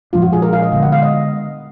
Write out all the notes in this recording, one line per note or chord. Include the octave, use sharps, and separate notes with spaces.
A#2 F3 G#3 D4 F4
F#4
G#4
A#4
F5
D#5
D3 G#3 B3 F5
F#5
F5
D#5